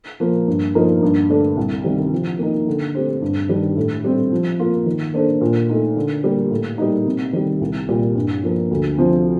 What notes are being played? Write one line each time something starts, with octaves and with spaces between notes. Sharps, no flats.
F3 A#3
G2
F3 A#3 D#4 A#4
G2
D3 A3 D4
C2
C3 D#3 G3
F3
A#3 D#4
D3
A3 C4 G4 C5
G2
D#3 G3 D4
A2
G3 C4 G4
F3
A#3 F4
D#3
A#3 D4 A4 C5
A#2
A3 D#4
D3
G3 A#3
A2
G3 A#3 D#4
C3
D#3 G3
C2
A#2 G3
G2
F3 A#3
D2
C3 F3 C4